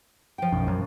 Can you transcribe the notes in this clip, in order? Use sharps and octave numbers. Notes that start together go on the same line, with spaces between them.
F3 G5
B1 F#2
F#2